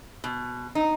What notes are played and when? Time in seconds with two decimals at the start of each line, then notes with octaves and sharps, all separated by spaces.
0.24 B2
0.75 D#4